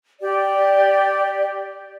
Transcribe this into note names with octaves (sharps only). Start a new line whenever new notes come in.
G4 D5